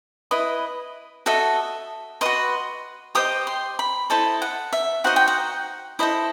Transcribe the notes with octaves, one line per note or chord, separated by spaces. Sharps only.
E4 B4 D#5
F#4 A4 D#5 E5
F#4 B4 D#5 C6
G4 C5 D#5 D#6
C6
B5
E4 A4 C5 D#5 A5
F#5
E5
D#4 F#4 C5 D#5 F#5
G5
F#5
E4 A4 C5 D#5